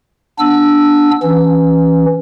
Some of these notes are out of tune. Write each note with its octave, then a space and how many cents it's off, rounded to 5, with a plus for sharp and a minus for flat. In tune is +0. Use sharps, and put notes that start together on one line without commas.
B3 -25 D4 +0 E6 +0
E3 +0 C#4 +0